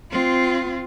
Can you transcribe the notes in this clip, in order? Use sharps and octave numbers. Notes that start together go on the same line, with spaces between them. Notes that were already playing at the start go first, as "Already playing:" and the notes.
C4 F4